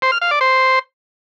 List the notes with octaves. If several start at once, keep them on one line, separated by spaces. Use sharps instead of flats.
C5
F6
F5
D5
C5